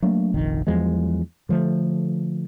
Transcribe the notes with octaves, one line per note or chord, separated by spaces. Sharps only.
F#3 A3 A#3 D4
F1 A#1 D#3
E2 F3 F#3 G#3
D3 F3 A3